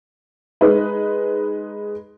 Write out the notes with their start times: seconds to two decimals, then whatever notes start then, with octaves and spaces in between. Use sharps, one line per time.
0.61 G#3 D#4 B4